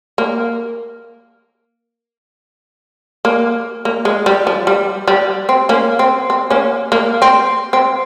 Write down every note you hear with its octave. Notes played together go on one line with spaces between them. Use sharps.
A#3
A#3
A#3
G#3
G3
F3
G3
G3
C4
A#3 C#4
C4
C4
A#3 C#4
A#3
C4
C4